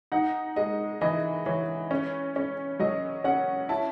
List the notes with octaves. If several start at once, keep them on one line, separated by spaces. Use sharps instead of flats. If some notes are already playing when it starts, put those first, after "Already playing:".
D#4 F#5
G#3 D#5
E3 D#5
E3 C#5
C#4
C#4
F#3 D#5
C#4 F#5
E4 A5